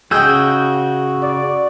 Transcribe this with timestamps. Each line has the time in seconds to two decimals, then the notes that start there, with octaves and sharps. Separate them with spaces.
0.11 C#3 F#4 G#4 D#5 G5 E6 G6
1.23 D5